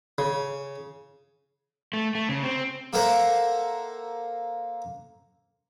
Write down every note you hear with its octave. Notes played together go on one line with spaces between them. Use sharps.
C#3
A3
A3
C#3
C4
A#3 A4 A#4 C5 E5 F#5